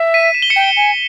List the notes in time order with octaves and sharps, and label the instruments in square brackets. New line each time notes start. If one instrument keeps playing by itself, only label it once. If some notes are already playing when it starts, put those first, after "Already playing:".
Already playing: [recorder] E5
[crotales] B6 D#7
E7
G7
C#7 E7
[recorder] G5
G#5